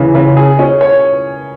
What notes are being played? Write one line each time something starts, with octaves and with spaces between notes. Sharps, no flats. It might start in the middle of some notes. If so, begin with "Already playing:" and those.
Already playing: C#3 E3
C#3
G#4
C#4
C#5